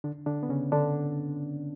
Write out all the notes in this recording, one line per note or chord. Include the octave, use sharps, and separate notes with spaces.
D3 D4
D3 D4
B3
C#3 C#4
D3 D4